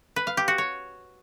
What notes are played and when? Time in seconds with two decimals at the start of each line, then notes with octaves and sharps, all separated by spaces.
0.16 B4
0.27 F5
0.37 G4
0.48 F#4
0.58 C#5